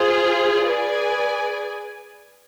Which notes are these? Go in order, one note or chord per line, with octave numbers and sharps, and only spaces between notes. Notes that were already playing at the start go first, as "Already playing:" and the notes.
Already playing: F4 G#4 C5
G#4 B4 D5 G#5